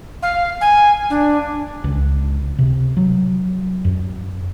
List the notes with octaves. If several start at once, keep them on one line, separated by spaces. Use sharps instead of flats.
F5
G#5
D4
C#2
C3
F#3
F#2